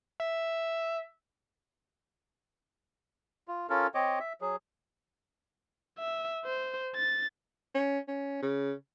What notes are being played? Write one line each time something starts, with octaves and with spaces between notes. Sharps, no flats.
E5
F4
C#4 F4 A4 A#4
C4 C#5 D#5 D6
E5
F#3 G#4
E5
C5
A6
C#4
C#4
C#3